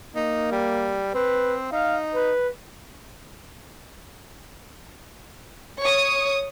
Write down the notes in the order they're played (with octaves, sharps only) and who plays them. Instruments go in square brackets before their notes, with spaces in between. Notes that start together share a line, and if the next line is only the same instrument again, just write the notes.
[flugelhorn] A#3 [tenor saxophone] D#4
[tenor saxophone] G3
[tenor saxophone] C4 [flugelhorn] B4
[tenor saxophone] D#4 [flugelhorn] F5
[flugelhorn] B4
[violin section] C#5 C#6 D#6